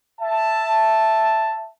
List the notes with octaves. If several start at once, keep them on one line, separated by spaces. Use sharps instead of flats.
E5 A5